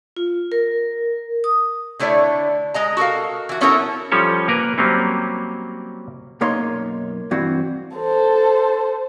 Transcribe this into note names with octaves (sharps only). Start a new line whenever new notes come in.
F4
A#4
D#6
D3 A3 E4 C#5 D5
G#3 D#5 A#5
F#4 A4 A#4 F5
E3 F#4
B3 C#4 E4 F#4 A4 A#4
F3 G3 C#4 A4 C#5
A#3 A#4 B4
F#3 G3 A#3 C4 C#4
B1 F#2 A#3 D#4 C#5 C6
G2 E3 C4 F#4
A4 C5